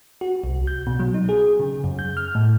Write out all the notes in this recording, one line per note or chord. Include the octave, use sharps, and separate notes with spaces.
F#4
C2
G6
B2
F#3
D#4
G#4
C#3
F#2
G6
F6
A2